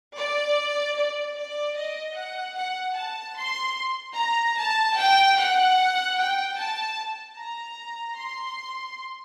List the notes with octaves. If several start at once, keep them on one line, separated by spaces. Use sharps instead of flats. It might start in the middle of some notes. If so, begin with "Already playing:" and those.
D5
D5
D5
D#5
F#5
F#5
A5
C6
A#5
A5
G5
F#5
G5
A5
A#5
C6